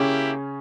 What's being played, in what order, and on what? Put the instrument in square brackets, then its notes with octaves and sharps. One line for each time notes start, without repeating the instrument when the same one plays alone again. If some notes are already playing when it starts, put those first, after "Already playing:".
Already playing: [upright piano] C#3 C#4 [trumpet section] A#3 E4 G4